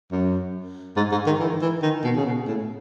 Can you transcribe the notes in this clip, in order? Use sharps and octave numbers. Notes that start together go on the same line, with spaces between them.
F#2
G#2
G#2
D#3
E3
E3
D#3
B2
C#3
B2
A2